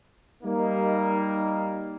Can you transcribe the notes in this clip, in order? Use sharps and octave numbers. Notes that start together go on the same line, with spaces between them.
G3 A#3 D#4